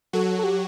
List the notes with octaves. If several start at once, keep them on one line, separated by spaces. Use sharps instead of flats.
F#3 F#4 A4
A4
G4